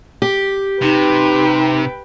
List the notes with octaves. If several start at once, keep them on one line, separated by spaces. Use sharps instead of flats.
G4
C3 D#4 B4 G5